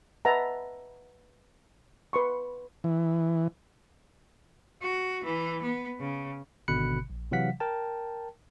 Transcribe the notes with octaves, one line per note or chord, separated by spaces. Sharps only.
B4 D#5 E5 F#5 A5 A#5
B4 C6 C#6
E3
F#4
E3
B3
C#3
G#1 B2 D3 B5 F#6 C#7
A#1
C3 E3 F#3 F5 F#5 B6
A#4 G5 A5